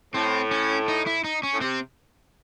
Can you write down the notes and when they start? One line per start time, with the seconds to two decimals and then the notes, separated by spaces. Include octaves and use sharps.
0.14 A2 C4
0.51 C#4
0.88 D#4
1.07 E4
1.24 D#4
1.43 C#4
1.54 A2
1.61 C3 C4